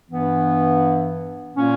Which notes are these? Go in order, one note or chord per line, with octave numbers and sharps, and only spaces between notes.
G2 E3 B3
A#2 A#3 C#4